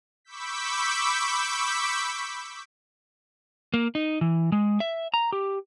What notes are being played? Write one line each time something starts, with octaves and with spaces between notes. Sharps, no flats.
B5 C#6 D6 E6 G6 B6
A#3
D#4
E3
G#3
E5
A#5
G4